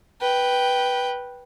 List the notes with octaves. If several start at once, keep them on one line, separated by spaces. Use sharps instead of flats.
B4 G5